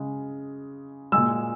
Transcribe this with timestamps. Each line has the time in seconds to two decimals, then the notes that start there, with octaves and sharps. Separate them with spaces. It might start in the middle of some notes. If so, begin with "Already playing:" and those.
Already playing: C#3 G#3
1.12 A#2 G#3 E6